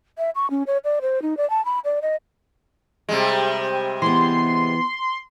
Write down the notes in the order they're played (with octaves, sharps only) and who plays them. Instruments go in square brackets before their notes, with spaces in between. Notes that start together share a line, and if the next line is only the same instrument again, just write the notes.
[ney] E5
C#6
C#4
C#5
D5
C5
D#4
D5
A5
B5
D5
D#5
[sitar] C3 G3 G#3
[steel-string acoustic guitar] E3 B3 [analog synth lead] C6